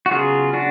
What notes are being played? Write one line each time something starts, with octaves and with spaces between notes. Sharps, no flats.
F#4
C#3 F#3 B3 F4 G#4
D4 F#4